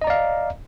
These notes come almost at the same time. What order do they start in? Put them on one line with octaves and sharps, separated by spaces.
D#5 A#5 D5 F5